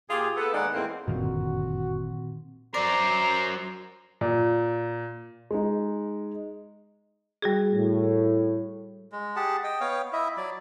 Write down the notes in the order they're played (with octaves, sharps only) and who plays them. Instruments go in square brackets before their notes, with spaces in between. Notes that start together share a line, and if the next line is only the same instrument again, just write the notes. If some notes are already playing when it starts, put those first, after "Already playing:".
[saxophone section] A#2 F4 G4 G#4
B3 A4
D#2 G#3 B3 D#4 D5 F#5
E2 A2 G#3 A#3 C4
[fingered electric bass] G1 F#2 D3 [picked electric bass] A#2 D#3 [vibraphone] C4 [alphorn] F#4
[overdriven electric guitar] F#3 A#4 [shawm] C5 [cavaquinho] D5 [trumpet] A#5
[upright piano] A#2
[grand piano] G#3 D#4
[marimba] G3 F#4 G#4
[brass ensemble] A2
[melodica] G#3
G4 G#4 F#5 A5
D#5 G5
B3 C#5 F5 G5
E4 D#5 E5
F#3 D5